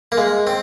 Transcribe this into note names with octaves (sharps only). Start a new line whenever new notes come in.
A#3
G#3
C4